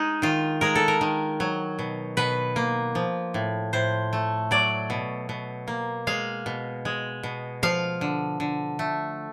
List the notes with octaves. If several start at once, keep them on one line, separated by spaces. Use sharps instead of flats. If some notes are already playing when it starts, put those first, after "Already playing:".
Already playing: G#3 D#4
D#3 F4
G#3 A#4
A4
A#4
D#3
F#3
B2
B2 B4
A#3
F3
A2
A2 C5
A3
F#3 D5
B2
B2
A#3
G#3 F5
B2
G#3
B2
F3 F5
D3
D3
A3